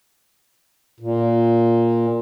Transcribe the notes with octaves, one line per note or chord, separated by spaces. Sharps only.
A#2